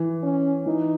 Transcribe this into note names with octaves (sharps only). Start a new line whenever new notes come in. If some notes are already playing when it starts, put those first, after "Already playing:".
Already playing: E3
C#4
E3 D#4